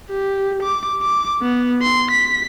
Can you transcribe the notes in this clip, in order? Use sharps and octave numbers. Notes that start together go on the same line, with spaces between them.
G4
D6
D6
B3
C6
B6